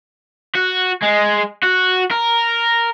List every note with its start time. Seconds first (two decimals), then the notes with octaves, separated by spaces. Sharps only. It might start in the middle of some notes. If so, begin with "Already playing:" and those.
0.55 F#4
1.03 G#3
1.63 F#4
2.11 A#4